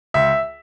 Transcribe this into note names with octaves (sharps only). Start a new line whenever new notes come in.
C#2 E5